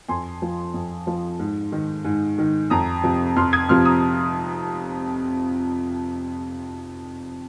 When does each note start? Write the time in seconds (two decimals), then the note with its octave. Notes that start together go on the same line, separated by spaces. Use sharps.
0.09 F2 G#5 C6
0.42 F3
0.74 F2
1.07 F3
1.39 G#2
1.72 D#3
2.05 G#2
2.38 D#3
2.70 F2 A#5 D#6
3.04 C3 F3
3.36 F2 C6 F6
3.53 D#6 G#6
3.69 C3 F3 C6 F6
3.85 A#5 D#6